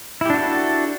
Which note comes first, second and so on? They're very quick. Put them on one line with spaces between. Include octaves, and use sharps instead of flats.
E4 G4 D4 F#4 A4